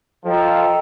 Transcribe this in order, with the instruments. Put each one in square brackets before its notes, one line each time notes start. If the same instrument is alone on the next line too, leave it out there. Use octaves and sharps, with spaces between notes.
[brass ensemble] F3 [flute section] A4 D#5 G5 A#5